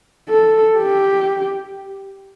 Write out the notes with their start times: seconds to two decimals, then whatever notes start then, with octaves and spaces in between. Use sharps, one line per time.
0.29 A4
0.78 G4